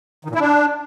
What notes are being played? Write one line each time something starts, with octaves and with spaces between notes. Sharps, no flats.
D#3
A#2
E4
D4